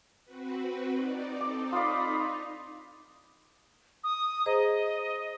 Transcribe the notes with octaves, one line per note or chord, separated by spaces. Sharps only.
C4 F#4 B4
D#4 D5
C4 D#4 A4 D6
D#4 F4 D5 F5 B5 D#6
D#6
G#4 C5 D#5 A#5